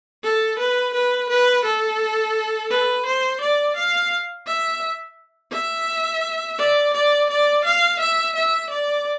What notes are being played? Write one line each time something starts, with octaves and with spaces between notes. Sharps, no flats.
A4
B4
B4
B4
A4
B4
C5
D5
F5
E5
E5
D5
D5
D5
F5
E5
E5
D5